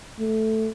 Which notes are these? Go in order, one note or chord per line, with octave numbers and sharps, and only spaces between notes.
A3